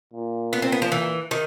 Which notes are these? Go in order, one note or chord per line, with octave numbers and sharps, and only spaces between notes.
A#2
B3
C4
B3
F3
E3
D#3